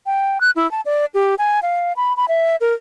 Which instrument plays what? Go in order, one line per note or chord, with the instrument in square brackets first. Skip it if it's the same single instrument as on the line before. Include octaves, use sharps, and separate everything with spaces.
[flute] G5
F#6
E4
A5
D5
G4
G#5
F5
B5
B5
E5
A#4